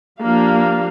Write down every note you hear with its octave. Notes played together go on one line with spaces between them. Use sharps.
F3 A#3 D4 G4 F5